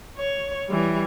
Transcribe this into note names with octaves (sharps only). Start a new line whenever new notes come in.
C#5
E3 G3